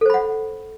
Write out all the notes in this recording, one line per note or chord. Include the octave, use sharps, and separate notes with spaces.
A4 C5 F#5 B5